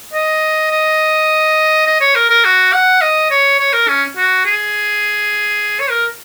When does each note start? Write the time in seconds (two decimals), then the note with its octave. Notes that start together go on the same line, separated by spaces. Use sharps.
0.13 D#5
0.71 D#5
1.87 D#5
2.01 C#5
2.15 A#4
2.30 A#4
2.45 F#4
2.73 F#5
3.01 D#5
3.31 C#5
3.59 C#5
3.73 A#4
3.88 C#4
4.17 F#4
4.45 G#4
5.80 C#5
5.90 A#4